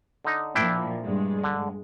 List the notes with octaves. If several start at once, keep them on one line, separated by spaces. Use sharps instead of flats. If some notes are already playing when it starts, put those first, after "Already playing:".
D3 D#4
A#2 F3 D4 E4 G5
G2 G#3
D3